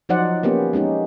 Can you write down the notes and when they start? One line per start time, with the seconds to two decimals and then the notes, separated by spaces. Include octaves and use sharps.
0.09 F3 F#3 D#4 C5 D5 F#5
0.43 A#3 B3 C#4 G4
0.73 G#3 C#4 D#4 G4